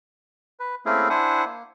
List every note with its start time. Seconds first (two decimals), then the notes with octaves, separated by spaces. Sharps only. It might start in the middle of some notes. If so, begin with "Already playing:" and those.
0.60 B4
0.86 A3 A#3 C4 C#4 E4 G#4
1.10 D4 E4 C5 F#5 G#5
1.45 A#3